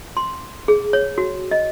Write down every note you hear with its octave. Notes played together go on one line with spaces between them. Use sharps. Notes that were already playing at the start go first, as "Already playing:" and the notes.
C6
G#4
C#5
F#4
D#5